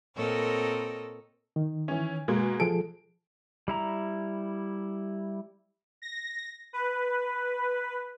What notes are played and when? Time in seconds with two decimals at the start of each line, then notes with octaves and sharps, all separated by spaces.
0.17 A#2 C4 A4 A#4 C#5 D#5
1.56 D#3
1.88 E3 C#4
2.28 B2 G#3 A#3
2.60 F3 G#4 A4 D7
3.68 G3 E4 A#5
6.02 A#6
6.73 B4